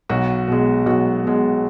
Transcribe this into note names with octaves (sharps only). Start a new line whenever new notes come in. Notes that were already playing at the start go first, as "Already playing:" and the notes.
B1 F#4
B2 G#3
B1 F#4
B2 G#3